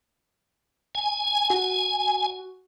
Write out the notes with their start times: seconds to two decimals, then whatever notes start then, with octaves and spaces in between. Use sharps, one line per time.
0.95 G#5
1.50 F#4